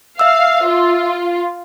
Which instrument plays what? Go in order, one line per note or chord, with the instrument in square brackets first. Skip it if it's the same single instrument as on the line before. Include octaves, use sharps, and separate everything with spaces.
[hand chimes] E5 E6 [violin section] F5
[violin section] F4